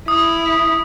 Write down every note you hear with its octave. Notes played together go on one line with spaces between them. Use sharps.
E4 D#6